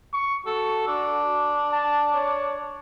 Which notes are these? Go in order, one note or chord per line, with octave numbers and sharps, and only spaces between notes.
C#6
F#4 A4
D4
A5
C#5